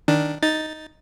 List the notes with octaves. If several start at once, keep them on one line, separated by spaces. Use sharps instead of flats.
D#3 D4
D#4 A6